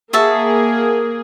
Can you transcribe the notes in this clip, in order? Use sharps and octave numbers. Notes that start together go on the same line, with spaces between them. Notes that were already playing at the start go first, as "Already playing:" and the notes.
A#3 F#4 G#4 E5 A5